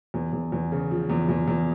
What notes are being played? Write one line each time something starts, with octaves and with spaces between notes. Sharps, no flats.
E2
E2
E2
C#3
F3
E2
E2
E2